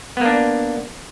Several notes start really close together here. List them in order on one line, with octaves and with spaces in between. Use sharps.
B3 A#3 D4